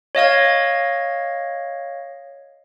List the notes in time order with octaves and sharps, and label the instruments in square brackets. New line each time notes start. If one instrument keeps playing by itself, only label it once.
[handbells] C#5 D#5 F5 G#6